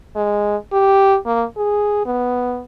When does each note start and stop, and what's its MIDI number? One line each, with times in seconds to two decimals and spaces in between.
0.16 0.56 56
0.73 1.17 67
1.26 1.44 58
1.57 2.05 68
2.06 2.62 59